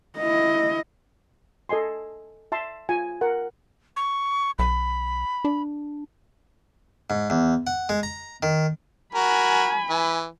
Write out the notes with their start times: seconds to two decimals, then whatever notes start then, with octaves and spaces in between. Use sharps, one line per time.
0.18 E4 D#5
1.69 A4 D#5 G#5 C6
2.52 E5 A5 C6
2.89 F4 G#5
3.21 A#4 F#5
3.96 C#6
4.59 B1 B5
5.45 D4
7.10 G#2
7.30 E2
7.67 F#5
7.89 G#3
8.03 A#5
8.43 D#3
9.15 F#4 A#4 G#5 B5
9.90 E3